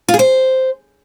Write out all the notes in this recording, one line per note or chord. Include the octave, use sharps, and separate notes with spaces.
F4
G#4
C5